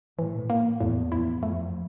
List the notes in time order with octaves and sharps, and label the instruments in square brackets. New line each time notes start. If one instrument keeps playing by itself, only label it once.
[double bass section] A2 [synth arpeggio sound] E3
[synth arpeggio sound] A#3
[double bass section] E2 [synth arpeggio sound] A2
[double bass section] E2 [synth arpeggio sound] E4
[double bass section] F2 [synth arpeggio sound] A3